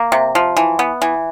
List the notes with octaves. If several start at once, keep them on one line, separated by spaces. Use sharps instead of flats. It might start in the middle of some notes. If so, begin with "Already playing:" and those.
Already playing: A#3
C3
F3
E3
B3
E3